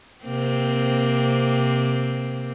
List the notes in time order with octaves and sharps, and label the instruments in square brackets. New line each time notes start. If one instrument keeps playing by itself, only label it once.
[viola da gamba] C3 A#3 C4